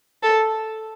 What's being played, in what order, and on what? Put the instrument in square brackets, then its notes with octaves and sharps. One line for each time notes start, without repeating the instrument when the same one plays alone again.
[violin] A4